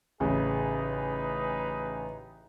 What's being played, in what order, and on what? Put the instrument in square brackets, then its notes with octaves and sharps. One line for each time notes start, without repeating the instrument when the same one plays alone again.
[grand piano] A1 C#3 [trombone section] D#4 G#4 B4